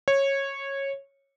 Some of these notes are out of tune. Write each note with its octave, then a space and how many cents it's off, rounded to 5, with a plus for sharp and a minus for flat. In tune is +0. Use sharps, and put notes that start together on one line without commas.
C#5 -15